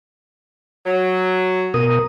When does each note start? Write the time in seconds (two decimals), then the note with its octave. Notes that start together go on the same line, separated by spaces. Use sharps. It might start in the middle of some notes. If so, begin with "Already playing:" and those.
0.86 F#3
1.74 B2 A#4 D#6